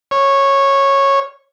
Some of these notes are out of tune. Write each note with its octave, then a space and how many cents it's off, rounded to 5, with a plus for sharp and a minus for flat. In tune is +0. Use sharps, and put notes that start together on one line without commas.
C#5 -10